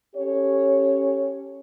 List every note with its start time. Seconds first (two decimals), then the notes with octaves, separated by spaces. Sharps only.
0.15 C#4 G4 A4 C#5